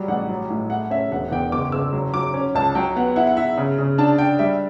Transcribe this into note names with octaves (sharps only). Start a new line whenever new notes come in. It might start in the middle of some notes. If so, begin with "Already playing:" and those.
Already playing: F#3 G3
A1 F#5
F#3
A2
A3 F#5
C#4 E5
E1 F#5
F#5
E2 G5
F#1 D6
F#1 E6
F#3
F#3 D6
C#4
C#2 A5
F#3 G5
B3 F#5
E4 F#5
F#5
E4 E5
C#3
C#3
D4 A5
D4 G5
G3 E5